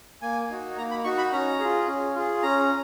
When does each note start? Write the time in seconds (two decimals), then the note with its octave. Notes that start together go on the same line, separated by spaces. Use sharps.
0.22 A#3 G#5
0.50 D#4 F#4
0.77 A#3 A#5
0.91 B5
1.04 D#4 F#4 C#6
1.18 B5
1.32 C#4 A#5
1.60 F4 G#4
1.87 C#4
2.15 F4 G#4
2.43 C#4 A#5